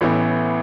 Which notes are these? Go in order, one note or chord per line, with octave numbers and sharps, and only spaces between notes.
A1 A2 E3 B3 E4